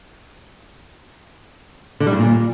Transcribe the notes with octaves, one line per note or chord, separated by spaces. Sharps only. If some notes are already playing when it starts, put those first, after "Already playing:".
D3
G3
G2
A#2